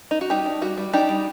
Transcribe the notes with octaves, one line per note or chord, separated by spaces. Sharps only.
D#4
F#4
G3 D#4 G4
D4
G3 F#4
G3
D4 D#4 G4
G3